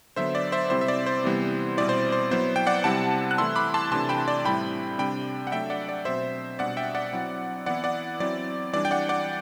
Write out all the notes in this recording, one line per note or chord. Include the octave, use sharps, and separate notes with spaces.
D3 F#3 B3 C5 E5
D5
C5 E5
C3 G3 C4 E4 C5
E5
D5
C5
C3 E3 G3 B3 E4
B2 G3 C4 E4 D5
C5
C5
F#3 B3 E4 C5
G5
D5 F#5
C3 G3 C4 E4 F#5 A5
F#6
E3 A3 E4 C6 E6
B5 D6
A5 C6
C3 E3 A3 D4 A5 C6
G5 B5
D5
A2 G3 C4 E4 G5 B5
C3 G3 D4 G5 B5
F#5
F#3 A3 D4 E5 G5
D5 F#5
D5
B2 F#3 C4 C5 E5
B2 G3 D4 D5 F#5
E5 G5
D5 F#5
F#3 C4 E4
E3 B3 E4 D5 F#5
D5 F#5
F#3 C4 E4 D5
E3 G3 D4 D5
G5
D5 F#5
D5 F#5